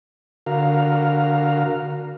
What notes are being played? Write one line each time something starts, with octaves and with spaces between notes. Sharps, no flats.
D3 F#4 A#4 F5